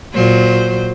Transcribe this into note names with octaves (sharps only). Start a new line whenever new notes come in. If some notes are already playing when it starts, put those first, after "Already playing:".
A#2 F#3 C5